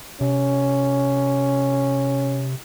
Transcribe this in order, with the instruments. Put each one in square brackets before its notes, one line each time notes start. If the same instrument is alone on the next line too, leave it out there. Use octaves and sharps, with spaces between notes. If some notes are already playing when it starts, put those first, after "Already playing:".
[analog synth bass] C3 [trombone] C#4